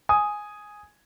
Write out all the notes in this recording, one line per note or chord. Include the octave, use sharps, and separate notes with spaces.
G#5 D#6